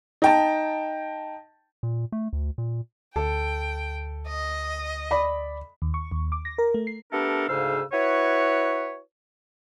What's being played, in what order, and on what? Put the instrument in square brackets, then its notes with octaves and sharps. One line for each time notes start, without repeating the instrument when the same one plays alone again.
[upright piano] D#4 G5 A5
[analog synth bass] A#2
A3
D2
A#2
[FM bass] D2 [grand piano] A4 [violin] G5
[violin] D#5
[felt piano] D5 B5
[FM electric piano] D#2
C#6
D#2
D6
A#6
A#4
A3
C7
[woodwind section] A3 B3 D4 G4 A4 A#4
D2 G#2 C#3 C5 F5 E6
E4 F#4 B4 C#5